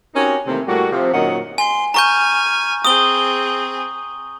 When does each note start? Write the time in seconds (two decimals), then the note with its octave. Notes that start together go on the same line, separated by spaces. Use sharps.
0.15 C4 C#4 D#4 F#4 G4 A#4
0.47 C3 D#3 E3 A3 A#3 C4
0.68 A2 G3 A#3 F#4
0.91 C3 F3
1.13 F#2 A#2 D#3 C#5 D#5 F#5
1.58 G#5 C6
1.94 G#5 A#5 C#6 F6 G6
2.85 C4 G#4 D#6 G7